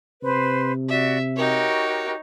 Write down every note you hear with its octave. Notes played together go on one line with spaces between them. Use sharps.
C3 B4 C5 C6
F#4 D5 E5
D#4 F#4 G4 A#4 C#5